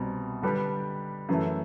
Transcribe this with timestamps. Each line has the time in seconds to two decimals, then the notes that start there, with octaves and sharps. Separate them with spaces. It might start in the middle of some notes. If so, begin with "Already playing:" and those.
Already playing: C2 B2 G3 C4
0.42 D3 G3 D4 G4 B4
1.29 F#2 E3 A3